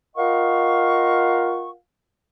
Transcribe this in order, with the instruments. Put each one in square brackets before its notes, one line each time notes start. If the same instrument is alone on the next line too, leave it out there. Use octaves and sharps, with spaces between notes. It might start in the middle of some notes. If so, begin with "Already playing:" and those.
[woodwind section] F4 A#4 D#5 F5 F#5 C#6